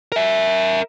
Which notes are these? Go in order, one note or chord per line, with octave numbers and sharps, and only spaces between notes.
A#4 E5